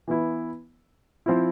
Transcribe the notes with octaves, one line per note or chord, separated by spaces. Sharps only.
E3 B3 E4
F3 C4 E4